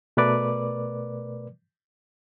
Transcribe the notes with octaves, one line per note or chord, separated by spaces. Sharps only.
B2 A3 A#4 B4 D5 D6